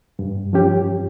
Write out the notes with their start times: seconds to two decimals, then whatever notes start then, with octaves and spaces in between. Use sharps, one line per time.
0.19 G2
0.53 F3 C#4 G4